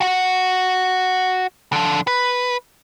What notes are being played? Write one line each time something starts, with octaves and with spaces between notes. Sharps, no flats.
F#4 F#5
D3 F3
B4